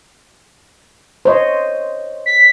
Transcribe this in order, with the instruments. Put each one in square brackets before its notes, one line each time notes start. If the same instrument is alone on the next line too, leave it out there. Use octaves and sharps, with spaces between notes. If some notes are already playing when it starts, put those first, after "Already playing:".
[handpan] C5 C#5 D#5
[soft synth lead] B6